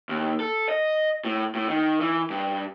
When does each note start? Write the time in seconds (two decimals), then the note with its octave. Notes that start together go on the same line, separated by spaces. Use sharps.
0.09 D#2
0.40 A4
0.69 D#5
1.25 A2
1.55 A2
1.70 D#3
2.01 E3
2.30 G2